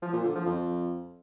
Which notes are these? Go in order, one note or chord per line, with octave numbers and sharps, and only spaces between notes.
F3
A#2
D3
F3
F2